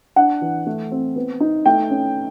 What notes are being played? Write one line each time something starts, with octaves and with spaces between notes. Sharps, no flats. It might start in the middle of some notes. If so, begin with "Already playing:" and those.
D4 F#5
E3
A3
C4
B3
D#4
A3 G5
C#4